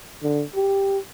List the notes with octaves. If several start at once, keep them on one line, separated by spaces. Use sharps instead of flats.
D3
G4